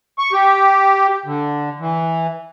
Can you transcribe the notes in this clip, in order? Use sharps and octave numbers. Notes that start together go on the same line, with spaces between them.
C#6
G4
D3
E3